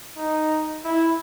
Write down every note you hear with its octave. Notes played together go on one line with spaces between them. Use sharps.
D#4
E4